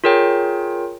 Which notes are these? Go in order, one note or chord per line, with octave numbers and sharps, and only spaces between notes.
F4 G#4 A#4 C#5 G5